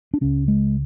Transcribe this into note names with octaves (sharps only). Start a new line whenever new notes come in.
D4
C#2 C#3 C#4
G#3